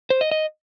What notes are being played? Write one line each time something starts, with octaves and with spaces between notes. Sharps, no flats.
C5
D#5
D#5